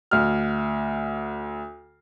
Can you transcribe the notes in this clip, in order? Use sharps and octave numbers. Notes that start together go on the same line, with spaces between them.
D2 F6